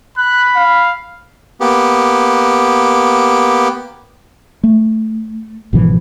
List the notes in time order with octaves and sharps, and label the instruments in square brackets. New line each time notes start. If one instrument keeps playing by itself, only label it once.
[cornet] B5 [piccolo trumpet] F#6
[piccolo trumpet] F5
[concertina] A#3 B3 G4
[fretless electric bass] A3
G#1 B2 E3 F3